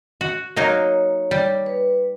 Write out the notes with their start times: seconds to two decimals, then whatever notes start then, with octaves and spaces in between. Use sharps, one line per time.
0.21 F#4
0.56 F#3 A#3 D#4 C#5
1.31 G3
1.66 B4